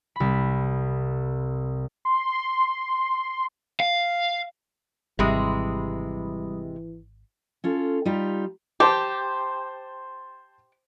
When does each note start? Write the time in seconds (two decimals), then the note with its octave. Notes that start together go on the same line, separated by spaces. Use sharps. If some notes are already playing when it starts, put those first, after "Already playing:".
0.16 C2 B5
2.05 C6
3.80 F5
5.19 G#1 C3 E3 G3 G#3 B5 D#6
7.64 C#4 F4 A4
8.05 G3 D#4 F4 G4
8.80 G4 C5 A5 C6